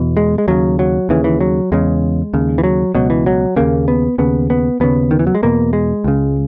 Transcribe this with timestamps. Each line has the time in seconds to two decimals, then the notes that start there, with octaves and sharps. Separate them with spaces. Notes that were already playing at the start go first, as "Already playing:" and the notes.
Already playing: E2 B2
0.17 G#3
0.38 G#3
0.48 D#2 C#3 F#3
0.79 F#3
1.09 D#2 C#3 E3
1.24 E3
1.41 F#3
1.72 E2 C#3 G#3
2.34 D#2 C#3
2.58 E3
2.64 F#3
2.95 C#2 B2 F#3
3.10 E3
3.26 F#3
3.56 D#2 C#3 A#3
3.88 B3
4.18 D#2 C#3 B3
4.50 B3
4.80 D#2 C#3 B3
5.11 D#3
5.19 E3
5.27 F#3
5.35 G#3
5.43 E2 B2 A#3
5.73 G#3
6.04 C#2 C#3